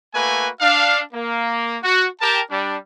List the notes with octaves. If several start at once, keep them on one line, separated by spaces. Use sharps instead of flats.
A3 A#3 F#4 B4 G#5
D4 F5
A#3
F#4
G4 A#4 G5 A5
G3 D4